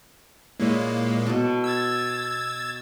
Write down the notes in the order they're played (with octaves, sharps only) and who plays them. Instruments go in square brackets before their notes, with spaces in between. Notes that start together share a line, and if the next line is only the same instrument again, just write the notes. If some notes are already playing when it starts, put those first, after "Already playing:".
[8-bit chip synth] A#2 G#3 A#3 [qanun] E4 C#5 D#5
[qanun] B2 A4 A5
[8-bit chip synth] E6 G#6 A6